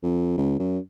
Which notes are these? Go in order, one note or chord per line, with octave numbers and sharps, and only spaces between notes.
F2
C#2
F#2